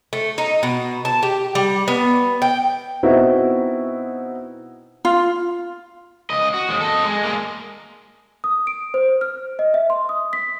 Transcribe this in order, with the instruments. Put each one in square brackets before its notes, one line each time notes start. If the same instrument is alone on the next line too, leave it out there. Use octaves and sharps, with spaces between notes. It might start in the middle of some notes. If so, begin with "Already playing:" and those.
[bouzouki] A3
D#4
B2
A5
G4
G3
B3
G5
[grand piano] B2 B3 C4 D#4 E4 F#4
[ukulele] F4
[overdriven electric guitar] C#2 D#5
F#4
D#2 G#3
A4 D#5
G#3
G#3 A#3
[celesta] D#6
D7
C5
F6
D#5
E5
C6
D#6
B6